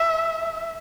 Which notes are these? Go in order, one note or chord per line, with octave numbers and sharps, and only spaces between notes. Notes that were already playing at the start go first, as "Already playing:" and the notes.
Already playing: E5